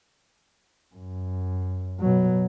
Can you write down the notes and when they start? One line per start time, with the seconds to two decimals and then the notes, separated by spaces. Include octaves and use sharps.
0.95 F#2
2.01 B2 F#3